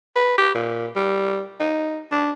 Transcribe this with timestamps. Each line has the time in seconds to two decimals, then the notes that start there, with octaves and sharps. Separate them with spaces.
0.15 B4
0.38 G4
0.55 A#2
0.96 G3
1.60 D#4
2.11 D4